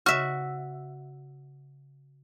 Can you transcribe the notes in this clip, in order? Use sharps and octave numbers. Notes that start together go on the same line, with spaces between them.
C#3 F#4 E5